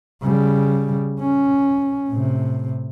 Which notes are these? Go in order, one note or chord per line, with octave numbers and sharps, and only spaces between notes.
C#3 G3
C#4
A2 C3